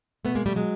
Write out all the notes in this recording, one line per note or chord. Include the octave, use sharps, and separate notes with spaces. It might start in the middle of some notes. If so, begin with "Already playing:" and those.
B2 A3 B3
G#3 A#3
B2 G3 A3
F#3 G#3